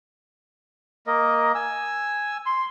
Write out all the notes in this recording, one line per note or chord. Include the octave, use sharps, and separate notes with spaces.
A#3 A#4 D#5
G#5 E6
C6